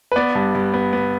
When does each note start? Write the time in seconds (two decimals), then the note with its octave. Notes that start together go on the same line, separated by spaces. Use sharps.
0.12 B4
0.16 B3 D5
0.35 G2
0.54 G2
0.74 B3
0.93 B3